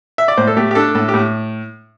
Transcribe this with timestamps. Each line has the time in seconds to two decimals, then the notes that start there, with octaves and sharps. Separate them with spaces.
0.18 E5
0.28 D5
0.37 A2 C5
0.47 A4
0.57 A3 G4
0.71 G4
0.75 D4 A4
0.95 A2 A4
1.08 G4
1.14 A2